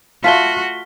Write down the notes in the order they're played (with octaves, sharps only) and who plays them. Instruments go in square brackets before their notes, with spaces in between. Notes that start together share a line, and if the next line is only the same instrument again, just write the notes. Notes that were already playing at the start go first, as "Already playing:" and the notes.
[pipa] A3 F4 [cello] F#4 [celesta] B6 G7